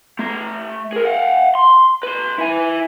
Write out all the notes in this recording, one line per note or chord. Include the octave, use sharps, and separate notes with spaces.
A3 A#5
G#4 A#4
F5 F#5
C6
B4 C6
E4 G#5